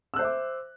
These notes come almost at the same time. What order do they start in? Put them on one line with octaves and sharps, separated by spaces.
E6 F#6 C5 E5 D6